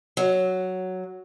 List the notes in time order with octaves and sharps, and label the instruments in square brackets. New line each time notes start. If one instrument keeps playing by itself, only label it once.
[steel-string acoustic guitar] F#3